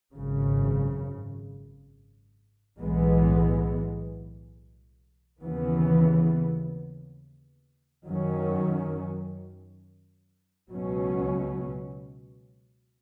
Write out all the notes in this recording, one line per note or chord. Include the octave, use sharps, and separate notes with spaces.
G#1 F#2 C#3
B1 A2 E3 G#3 B3
D#2 C#3 E3 B3
F#2 D#3 F#3 C#4
C#2 B2 F#3 C#4